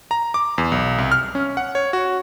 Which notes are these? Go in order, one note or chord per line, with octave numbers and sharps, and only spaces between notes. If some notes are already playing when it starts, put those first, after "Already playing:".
A#5
D6
E2
B1
C2
F6
C#4
F#5
C#5
F#4